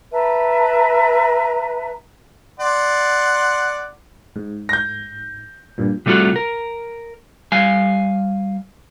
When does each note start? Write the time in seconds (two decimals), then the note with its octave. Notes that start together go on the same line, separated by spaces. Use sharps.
0.12 B4 E5 A5 A#5
2.60 D5 F#5 C6
4.36 G#2
4.69 G6 A#6
5.78 G2 A#2
6.06 C3 G3 A3 F4 F#4
6.36 A#4
7.52 G3 F5 G#5